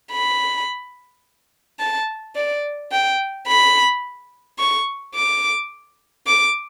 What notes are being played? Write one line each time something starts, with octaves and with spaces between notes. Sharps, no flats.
B5
A5
D5
G5
B5
C#6
D6
D6